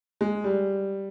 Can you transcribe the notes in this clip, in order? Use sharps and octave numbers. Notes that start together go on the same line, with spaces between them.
G#3
G3